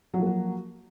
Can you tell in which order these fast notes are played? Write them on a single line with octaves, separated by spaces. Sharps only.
F#3 F3 A#3 F#4